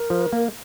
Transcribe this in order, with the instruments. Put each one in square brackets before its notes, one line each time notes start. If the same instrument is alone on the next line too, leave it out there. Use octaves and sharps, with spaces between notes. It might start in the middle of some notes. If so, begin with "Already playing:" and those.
Already playing: [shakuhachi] A#4
[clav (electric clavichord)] F3
A#3